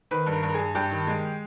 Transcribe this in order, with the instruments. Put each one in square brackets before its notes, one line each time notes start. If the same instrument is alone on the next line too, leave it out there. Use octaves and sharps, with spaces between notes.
[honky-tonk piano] D#3 B4
G2
A#4
G2
A#4
G2 G#4
G2 G4
D#3
G#3